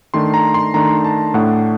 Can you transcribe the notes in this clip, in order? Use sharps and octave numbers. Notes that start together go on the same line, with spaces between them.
D#3 A3 D4 C6
A#5
C6
D#3 A3 D4 A#5
A5
A2 A3 D4 F#5